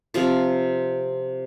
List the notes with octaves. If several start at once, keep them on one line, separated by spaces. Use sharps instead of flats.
C3 F3 F4